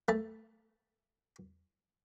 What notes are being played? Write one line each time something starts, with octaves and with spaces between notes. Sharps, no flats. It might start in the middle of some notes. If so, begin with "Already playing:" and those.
A3 A5